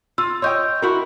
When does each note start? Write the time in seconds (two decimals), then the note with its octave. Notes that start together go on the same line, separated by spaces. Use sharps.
0.18 F4 E6
0.42 C#5 D#5 G5 C6 C#6 G6
0.82 E4 F#4 A#4